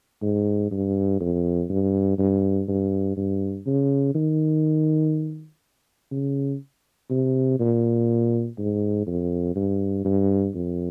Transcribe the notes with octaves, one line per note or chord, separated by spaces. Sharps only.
G#2
G2
F2
G2
G2
G2
G2
C#3
D#3
C#3
C3
A#2
G#2
F2
G2
G2
F2